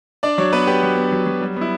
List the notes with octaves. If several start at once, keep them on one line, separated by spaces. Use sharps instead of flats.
D4 D5
F#3 C#5
B3 B4
B3 G4
F#3
B3
F#3
F#3
G3
B3
E4